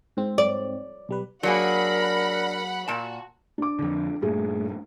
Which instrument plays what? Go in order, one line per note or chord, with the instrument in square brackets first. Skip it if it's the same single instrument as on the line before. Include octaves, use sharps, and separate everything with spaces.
[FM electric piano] G#2 C4
[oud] D5
[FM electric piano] B1 G3 B4
[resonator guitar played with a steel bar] F#3 A#3 G#4 [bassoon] D4 [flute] A#4 [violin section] F#5 B5
[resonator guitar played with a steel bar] A#2 A5 [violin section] F#4
[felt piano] D4 D6
[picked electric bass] F2 D3
[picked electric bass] G2 A#2 [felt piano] A3 G#4